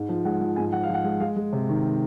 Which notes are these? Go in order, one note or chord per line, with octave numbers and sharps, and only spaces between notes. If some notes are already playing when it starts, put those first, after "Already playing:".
Already playing: G#2
F3
G#3 F#5
F3
G#2 G#5
F3 F#5
F5
F3 F#5
G#3
G#3 F5
G#3
C3
D#3